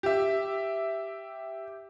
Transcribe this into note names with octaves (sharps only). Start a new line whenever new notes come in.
G4 E5